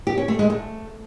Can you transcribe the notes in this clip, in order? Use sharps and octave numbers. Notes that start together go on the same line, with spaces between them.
G4
C#4
A3
G#3
A3